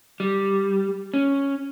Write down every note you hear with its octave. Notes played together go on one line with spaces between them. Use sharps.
G3
C#4